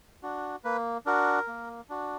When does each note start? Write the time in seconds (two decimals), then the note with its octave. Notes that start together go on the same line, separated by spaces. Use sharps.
0.23 D4 F#4
0.64 A#3 B4
1.06 D4 F#4 A#4
1.48 A#3
1.90 D4 F#4